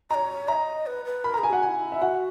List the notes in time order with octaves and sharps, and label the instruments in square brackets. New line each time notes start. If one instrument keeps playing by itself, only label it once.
[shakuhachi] C#5 D#5 [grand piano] A#5
[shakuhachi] D#5 E5 [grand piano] A#5
[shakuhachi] B4
B4
[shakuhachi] A#4 [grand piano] B5
[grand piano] A#5
[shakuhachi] G#4
[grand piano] G#5
[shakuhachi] F#4 [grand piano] F#5
[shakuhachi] F#4 [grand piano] G#5
[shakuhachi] E4
[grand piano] E5
[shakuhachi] F#4 [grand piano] F#5